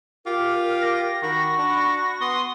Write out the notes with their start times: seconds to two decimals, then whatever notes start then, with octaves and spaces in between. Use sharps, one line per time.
0.26 F4 G4 A#4
0.81 A#6
1.23 D#3 F#4 B5
1.58 D4
2.21 B3 C6 D#6